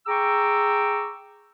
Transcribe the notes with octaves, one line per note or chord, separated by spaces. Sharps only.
G#4 G5 A#5 C#6 D6 E6